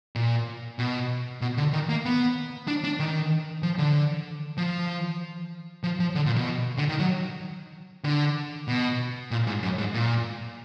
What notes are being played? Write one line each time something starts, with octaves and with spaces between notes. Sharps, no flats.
A#2
B2
B2
D3
D#3
A#3
B3
D4
D4
D#3
F3
D3
F3
F3
F3
D3
A#2
B2
D3
D#3
F#3
D3
B2
A#2
G#2
F#2
G#2
A#2